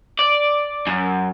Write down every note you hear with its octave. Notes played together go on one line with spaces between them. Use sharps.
D5
F#2